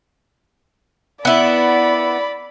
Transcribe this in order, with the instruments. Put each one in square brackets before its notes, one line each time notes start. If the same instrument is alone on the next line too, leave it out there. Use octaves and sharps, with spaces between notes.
[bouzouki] B3 E4 [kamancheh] D5 B5